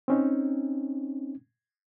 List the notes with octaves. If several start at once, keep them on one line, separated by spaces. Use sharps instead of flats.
C4 C#4 D#4